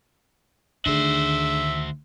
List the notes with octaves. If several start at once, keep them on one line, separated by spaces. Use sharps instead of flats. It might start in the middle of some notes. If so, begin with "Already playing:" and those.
D2 D#3 D4 F#4 G#4 C5 E5